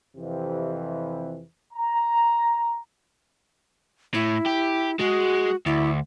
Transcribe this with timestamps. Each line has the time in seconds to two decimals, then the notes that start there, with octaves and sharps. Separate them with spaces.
0.17 F2 C3 E3
1.74 A#5
4.14 A2 E4
4.46 G4
4.99 G#3 F#4
5.66 D2 E4